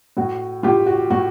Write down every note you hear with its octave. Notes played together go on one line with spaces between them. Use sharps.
A2 F#4
A2 F4 G4
F#4
A2 F#4